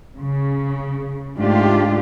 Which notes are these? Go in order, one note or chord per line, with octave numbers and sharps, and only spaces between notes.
C#3
G#2 A3 D4 F4 G4